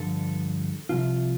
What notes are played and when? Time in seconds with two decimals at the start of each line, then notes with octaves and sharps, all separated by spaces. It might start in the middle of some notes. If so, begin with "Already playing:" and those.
Already playing: G2 D3 F3 A4
0.89 C2 C3 F3 F4